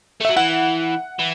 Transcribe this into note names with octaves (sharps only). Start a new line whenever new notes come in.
A3
F#3 E5
E3 F#5
E3